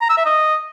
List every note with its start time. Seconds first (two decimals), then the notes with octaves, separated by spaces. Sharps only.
0.01 A#5
0.09 E6
0.17 E5
0.26 D#5